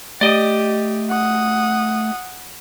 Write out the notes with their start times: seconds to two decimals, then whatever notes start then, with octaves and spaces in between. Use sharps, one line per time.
0.21 A3 G4 D5 D#5
1.10 F#5 D#6